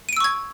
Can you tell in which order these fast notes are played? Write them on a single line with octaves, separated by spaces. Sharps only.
D#7 D7 E6 C#6 G#6